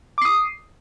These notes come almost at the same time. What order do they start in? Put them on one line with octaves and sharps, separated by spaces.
D6 C7 D#6